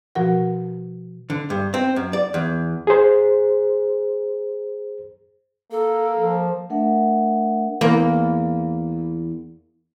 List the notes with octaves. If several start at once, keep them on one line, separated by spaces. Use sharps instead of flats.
B2 F3 F#4 A#4 F#5
D3
G2
C4
F#2
D5
E2
G#4 C5
A#3 A4
F3
A3 D4 A#4 E5 F#5
E2 A#3